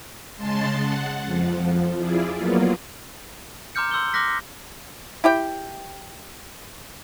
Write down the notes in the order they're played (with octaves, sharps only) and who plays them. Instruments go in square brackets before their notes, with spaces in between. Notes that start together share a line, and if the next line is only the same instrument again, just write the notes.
[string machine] C#3 G#3 A5 C6 A6
F#5
F2 F3
E4 F4 G#4 D5
F#3 A#3 B3 F4
[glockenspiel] A#5 C6 D6 F6 G6 C#7
C6 E6 G6 G7
C6 D6 F6 F#6 A#6 B6
[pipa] E4 G4 G5